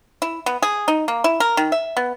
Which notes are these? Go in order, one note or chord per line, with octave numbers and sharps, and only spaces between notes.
E4
B3
G#4
D#4
A#3
E4
A#4
D#3
E5
B3